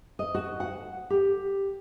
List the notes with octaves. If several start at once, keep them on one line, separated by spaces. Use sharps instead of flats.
D#5
F#4
F#5
G4